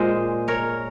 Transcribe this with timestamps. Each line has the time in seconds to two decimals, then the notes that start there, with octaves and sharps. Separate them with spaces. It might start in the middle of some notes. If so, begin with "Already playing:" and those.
Already playing: A#2 G#3 C5 D#5
0.48 A#4 C#5